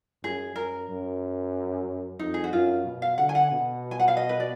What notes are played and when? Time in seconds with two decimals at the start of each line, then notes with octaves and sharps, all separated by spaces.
0.23 F#2 G#4
0.56 F#2 A#4
0.89 F#2
2.19 F2 D#4
2.34 G#4
2.44 F#4
2.53 F#2 F4
2.86 B2
3.02 F5
3.18 D3 F#5
3.29 G#5
3.35 F#5
3.52 B2
3.91 G#5
4.00 F#5
4.08 F5
4.17 D#5
4.29 B4
4.40 D5